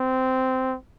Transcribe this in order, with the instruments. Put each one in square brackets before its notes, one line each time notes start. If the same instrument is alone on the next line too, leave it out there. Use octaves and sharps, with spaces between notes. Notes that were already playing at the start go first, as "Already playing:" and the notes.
Already playing: [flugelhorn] C4